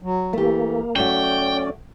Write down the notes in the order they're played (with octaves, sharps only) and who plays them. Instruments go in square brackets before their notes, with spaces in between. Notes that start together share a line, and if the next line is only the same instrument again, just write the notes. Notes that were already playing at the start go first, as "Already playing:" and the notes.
[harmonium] F#3
[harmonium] E3 [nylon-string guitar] A3 G4 [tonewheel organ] A#3
[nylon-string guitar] F#3 A3 F#4 [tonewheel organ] C#4 [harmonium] D5 [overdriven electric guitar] G5